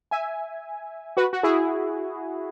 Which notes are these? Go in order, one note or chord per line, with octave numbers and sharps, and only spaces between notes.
E5 G#5
F#4 B4
F#4
E4 G#4